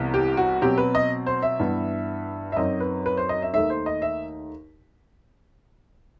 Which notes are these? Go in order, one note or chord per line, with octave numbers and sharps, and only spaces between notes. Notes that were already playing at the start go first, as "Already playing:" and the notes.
Already playing: C2 C3 E3 B3
G4
F#4
B2 F#3 C4 G4
B4
D#5
C5
E5
G2 E3 B3
E5
F#2 F#3 C4 D#4 D#5
B4
B4
C5
D#5
E5
D#2 D#3 A3 D#4 E5
C5
D#5
E5